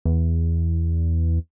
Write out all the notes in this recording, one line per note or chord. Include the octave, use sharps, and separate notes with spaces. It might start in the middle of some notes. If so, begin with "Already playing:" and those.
E2